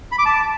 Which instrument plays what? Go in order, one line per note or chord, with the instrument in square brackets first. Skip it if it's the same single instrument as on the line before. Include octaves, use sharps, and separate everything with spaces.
[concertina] B5
D6
A5